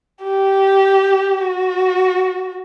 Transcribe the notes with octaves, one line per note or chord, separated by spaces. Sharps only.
G4
F#4